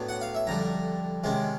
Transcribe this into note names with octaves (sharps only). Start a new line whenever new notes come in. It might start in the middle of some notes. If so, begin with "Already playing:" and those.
Already playing: A2 F#3 B3 D4
F#5
F5
E5
F2 D3 G3 A#5
C3 D#3 G#3 C#4